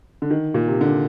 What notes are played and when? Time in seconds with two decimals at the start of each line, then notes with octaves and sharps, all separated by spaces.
0.22 D3
0.30 D#3
0.54 A#2
0.68 C3
0.81 D3